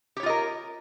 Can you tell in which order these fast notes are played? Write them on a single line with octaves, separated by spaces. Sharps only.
G4 C#5 F4 D#5 A#4